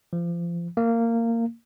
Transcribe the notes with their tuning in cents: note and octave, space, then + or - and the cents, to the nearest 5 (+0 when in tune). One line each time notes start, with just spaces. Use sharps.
F3 -30
A#3 -20